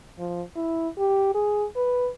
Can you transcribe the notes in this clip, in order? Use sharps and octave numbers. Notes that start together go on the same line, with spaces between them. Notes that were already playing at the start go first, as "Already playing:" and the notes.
F3
E4
G4
G#4
B4